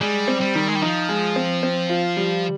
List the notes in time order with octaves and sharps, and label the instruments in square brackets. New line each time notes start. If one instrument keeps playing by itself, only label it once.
[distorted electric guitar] G3 [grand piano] G#3
[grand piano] C4
[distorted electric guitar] G3
[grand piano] D#3
[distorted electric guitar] G#3
G3
[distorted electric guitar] F3 [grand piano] D#4
[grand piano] G#3
C4
C4
F4
G3